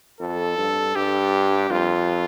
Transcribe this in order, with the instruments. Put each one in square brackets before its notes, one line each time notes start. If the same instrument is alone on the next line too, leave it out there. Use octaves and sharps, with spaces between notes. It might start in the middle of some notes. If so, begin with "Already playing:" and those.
[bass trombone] F2 [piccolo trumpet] A4
[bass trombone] G2
[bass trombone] G2 [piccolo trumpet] G4
[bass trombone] F2 [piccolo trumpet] F4